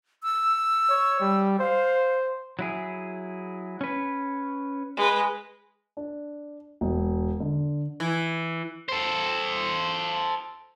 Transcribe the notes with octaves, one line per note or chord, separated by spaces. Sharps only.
E6
C#5
G3
C5 F5
F#3 E4 G#4
C#4 B4
G#3 B4
D4
E1
D3
E3
A4 C5